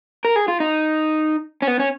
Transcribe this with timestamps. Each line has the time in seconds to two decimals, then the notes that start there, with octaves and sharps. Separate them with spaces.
0.25 A#4
0.36 G#4
0.48 F4
0.60 D#4
1.62 C#4
1.67 B3
1.79 C#4